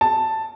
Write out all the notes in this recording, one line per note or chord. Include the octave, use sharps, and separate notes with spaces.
A5